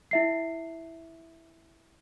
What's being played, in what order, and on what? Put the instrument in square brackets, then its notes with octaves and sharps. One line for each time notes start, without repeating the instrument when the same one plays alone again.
[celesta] E4 E5 C7